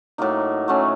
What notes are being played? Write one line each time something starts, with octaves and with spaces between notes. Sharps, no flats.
A2 F#3 A#3 D#4
F#3 A3 C#4